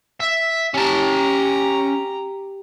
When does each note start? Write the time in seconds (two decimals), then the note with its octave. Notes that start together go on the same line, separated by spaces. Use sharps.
0.20 E5
0.74 C#4 G4 A5 A#5